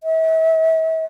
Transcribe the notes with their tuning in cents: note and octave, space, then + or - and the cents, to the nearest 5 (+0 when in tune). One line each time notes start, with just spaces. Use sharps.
E5 -40